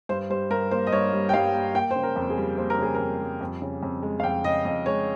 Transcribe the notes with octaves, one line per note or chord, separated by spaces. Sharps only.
G2 C5
G3 C5
G2 A#4
A#3 C5
D#5
G2 C#5
G3
G5
G2 F5
A#3
A#3 G5
C5
C#3
A#4
F2
G#4
G3
A#3 C5
A#4
C#3 G#4
F2 A#4
G3
F2
C#3
F2
G#3
F5
F2 G5
C#3 D#5
F2 D#5
G#3 C#5